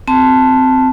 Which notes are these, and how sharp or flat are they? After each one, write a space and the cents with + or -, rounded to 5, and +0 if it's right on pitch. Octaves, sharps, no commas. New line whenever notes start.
C4 -15 A5 +0